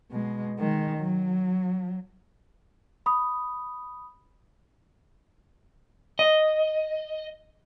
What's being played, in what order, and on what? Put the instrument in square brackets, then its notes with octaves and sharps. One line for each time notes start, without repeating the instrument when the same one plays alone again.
[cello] B2 G#3
D#3 G#3
F#3
[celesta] B5 D#6
[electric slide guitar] D#5